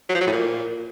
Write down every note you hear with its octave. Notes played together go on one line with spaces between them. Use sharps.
F#3
F3
F#3
A2
A#2